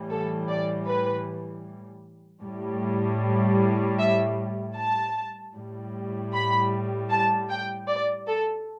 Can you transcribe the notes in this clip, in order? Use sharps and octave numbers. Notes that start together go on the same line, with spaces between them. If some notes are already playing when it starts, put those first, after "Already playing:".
Already playing: A2 E3 G3
A4
D5
B4
A2 G3
E5
A5
A2 G3
B5
A5
G5
D5
A4